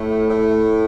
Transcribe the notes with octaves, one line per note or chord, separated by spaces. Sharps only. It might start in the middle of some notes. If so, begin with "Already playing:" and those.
Already playing: A2 A3
A2